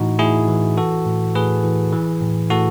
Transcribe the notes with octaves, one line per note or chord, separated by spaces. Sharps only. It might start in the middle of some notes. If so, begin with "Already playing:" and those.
Already playing: A2 E3 D#4 F#4
A2 E4 G#4
E3
E3 F#4 A4
A2
A2 G#4 B4
E3
E3
A2
A2 F#4 A4